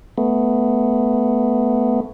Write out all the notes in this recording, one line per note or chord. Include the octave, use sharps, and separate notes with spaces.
A3 B3